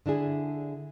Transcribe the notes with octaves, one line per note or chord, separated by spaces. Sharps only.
D3 D4 E4 G#4